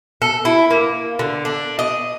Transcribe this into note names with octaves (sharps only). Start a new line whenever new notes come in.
A4
E4
A#3
D3
D4
D#5